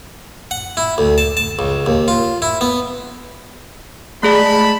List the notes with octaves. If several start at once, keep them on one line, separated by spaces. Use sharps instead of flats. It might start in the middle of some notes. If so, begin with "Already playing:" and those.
F#5
E4
D2
A5
A5
C#2
D#2
F4
E4
B3
G#3 A3 G#4 D5 A5 B5